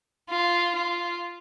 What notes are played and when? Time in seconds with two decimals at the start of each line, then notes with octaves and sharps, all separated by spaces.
0.30 F4
0.75 F4